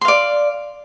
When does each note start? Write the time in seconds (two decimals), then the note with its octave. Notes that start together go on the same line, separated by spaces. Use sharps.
0.01 C6
0.05 F5
0.08 D5